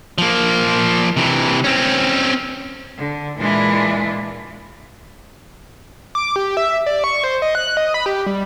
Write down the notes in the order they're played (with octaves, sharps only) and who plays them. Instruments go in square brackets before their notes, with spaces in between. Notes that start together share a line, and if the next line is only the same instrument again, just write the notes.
[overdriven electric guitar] F3 A#3
C3 E3
C4 C#4
[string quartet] D3
A#2 E3 G#3 D4 E4 F4
[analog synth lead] D6
G4
E5
D5
C#6
C5
D#5
F#6
D#5
B5
G4
G3